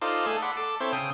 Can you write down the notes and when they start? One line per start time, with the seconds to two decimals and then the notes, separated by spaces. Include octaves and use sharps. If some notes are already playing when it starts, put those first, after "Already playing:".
0.02 D#4 F4 A4 C5 D5
0.26 A3 G#4 A4
0.42 D5 F#5 B5 C6
0.57 A4 D6
0.80 C4 E4 A4 C5 C#5
0.92 C#3 G5 D#6